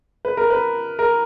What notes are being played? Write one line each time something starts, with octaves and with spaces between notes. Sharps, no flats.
B4
A#4
B4
A#4